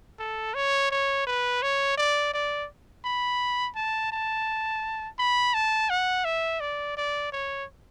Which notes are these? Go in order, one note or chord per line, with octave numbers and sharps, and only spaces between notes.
A4
C#5
C#5
B4
C#5
D5
D5
B5
A5
A5
B5
A5
F#5
E5
D5
D5
C#5